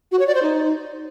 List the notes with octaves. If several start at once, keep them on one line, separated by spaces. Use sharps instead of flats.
F#4
C#5
D5
C5
D#4